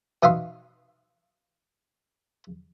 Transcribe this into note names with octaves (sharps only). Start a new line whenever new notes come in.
B2 D#4 E5 F5 C6